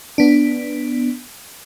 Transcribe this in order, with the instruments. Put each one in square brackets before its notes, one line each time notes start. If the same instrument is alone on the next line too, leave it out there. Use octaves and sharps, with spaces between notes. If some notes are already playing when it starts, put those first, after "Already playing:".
[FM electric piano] B3 D4